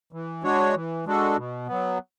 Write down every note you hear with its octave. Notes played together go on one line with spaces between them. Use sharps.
E3
G#3 D4 F#4 C#5
E3
G#3 D4 F#4 A4
B2
F#3 B3